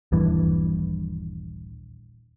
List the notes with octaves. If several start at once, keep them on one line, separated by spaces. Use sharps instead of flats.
D#1 A#1 G2 E3